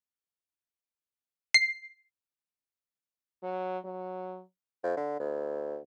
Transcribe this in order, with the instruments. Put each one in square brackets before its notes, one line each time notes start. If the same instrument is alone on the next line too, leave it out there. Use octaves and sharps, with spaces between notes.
[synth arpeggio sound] C7
[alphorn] F#3
F#3
[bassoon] F2
D3
D2